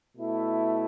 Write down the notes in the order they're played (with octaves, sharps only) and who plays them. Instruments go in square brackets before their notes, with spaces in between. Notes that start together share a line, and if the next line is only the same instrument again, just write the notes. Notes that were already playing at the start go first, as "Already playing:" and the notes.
[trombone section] B2 A3 E4